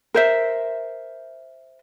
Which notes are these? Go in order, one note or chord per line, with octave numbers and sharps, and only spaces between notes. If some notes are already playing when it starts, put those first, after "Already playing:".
A#4 C5 E5